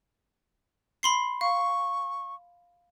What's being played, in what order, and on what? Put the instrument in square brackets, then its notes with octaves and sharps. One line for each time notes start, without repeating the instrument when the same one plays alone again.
[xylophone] B5 C6 C7
[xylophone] F5 [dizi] C#6